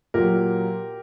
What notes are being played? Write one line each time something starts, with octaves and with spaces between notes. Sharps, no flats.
A#2 F#3 G4 A#4